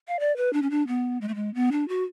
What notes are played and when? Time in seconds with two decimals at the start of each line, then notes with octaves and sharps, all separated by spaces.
0.08 F5
0.19 D5
0.37 B4
0.53 D4
0.62 C#4
0.70 D4
0.87 B3
1.21 G#3
1.28 A3
1.35 G#3
1.54 B3
1.72 D4
1.88 F#4